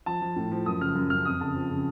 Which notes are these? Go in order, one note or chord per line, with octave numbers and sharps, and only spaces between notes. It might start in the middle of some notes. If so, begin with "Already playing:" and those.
F3 A5
F3
A2
F3
F#2 D#6
C#3 F6
F#2
F#2 F6
F2 D#6
C#3 A5
F3
C#3